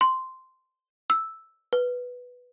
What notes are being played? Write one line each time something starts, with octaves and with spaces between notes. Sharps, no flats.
C6
E6
B4